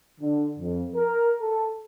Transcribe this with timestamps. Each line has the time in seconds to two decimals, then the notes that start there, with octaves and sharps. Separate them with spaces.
0.20 D3
0.59 F2
0.95 A#4
1.41 A4